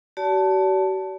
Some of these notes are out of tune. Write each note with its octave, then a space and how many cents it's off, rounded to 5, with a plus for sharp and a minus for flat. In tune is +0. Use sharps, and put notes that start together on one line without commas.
F#4 +45 D5 -40 A5 +0